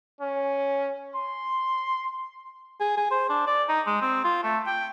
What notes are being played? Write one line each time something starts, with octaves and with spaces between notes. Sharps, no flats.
C#4
C6
G#4
G#4
C5
D4
D5
D#4
G#3
C4
F4
A3
G5